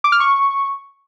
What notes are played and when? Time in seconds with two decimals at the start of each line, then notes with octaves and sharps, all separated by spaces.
0.04 D6
0.12 F6
0.20 C#6